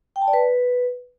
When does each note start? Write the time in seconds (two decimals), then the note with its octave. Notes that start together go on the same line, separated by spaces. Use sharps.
0.16 G5
0.22 A5
0.28 D5
0.33 B4